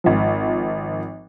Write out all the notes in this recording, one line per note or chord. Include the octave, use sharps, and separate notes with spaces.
G#1 F3